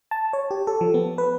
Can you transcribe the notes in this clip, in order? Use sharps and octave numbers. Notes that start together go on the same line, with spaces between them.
A5
C#5
G4
A4
F3
B3
B4